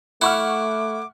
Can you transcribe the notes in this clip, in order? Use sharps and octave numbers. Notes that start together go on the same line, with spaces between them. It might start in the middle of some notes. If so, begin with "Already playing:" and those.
A3 E4 F#5 C#6 D6 F6